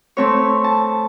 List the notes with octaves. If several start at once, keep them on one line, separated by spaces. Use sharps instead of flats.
A3 C4 C#5
A5